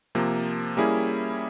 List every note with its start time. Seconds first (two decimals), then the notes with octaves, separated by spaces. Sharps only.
0.15 C3 F3 A#3
0.77 G3 A#3 C#4 E4 G#4